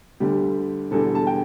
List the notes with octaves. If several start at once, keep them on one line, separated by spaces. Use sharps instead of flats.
D2 D3 G3 G4
E1 E2 D3 G3 A4
A5
G5